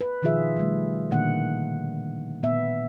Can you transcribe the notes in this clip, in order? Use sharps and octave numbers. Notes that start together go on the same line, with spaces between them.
B4
B2 D#3 F3 F4 G#4 E5
D#3 F3 G3 A3
A#2 D3 D#3 A#3 D4 F#5
A#2 B3 E5